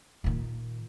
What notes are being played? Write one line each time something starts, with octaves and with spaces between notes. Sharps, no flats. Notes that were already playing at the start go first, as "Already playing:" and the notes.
A#2 D#3